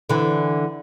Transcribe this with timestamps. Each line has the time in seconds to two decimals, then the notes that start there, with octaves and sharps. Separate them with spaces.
0.09 D3 E3